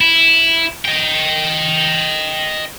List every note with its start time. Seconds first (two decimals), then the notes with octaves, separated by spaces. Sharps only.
0.01 E4
0.85 D#5 G5